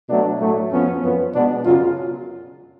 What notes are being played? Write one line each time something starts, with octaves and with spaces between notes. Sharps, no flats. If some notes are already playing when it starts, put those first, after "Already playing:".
B2 F#3 A3 D4
A2 F#3 A3
F2 F3 B3 C#4
F#2 F3 B3
B2 G#3 B3 D4
F#2 C#3 F#3 F4